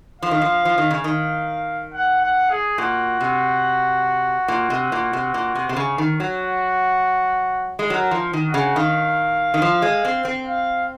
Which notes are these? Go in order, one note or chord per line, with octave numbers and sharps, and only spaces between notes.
F3 F5
D#3
F3
F3
D#3
C#3
D#3 F5
F#5
F#5
G#4
A#2 F#4
C3
A#2
C3
A#2
C3
A#2
C3
C3
C#3
D#3
F#3 F#4
G#3
F#3 A#4
F3
D#3
F#4
C#3
D#3 F5
D#3
F3
G#3
C4
C4
F5